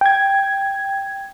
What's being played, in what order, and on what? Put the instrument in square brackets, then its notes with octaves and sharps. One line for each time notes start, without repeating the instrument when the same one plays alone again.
[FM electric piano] G5 G#6